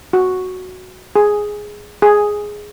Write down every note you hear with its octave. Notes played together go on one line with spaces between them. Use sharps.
F#4
G#4
G#4